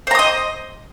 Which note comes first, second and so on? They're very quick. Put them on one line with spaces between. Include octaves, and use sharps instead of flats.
C5 A#5 D#6 D#5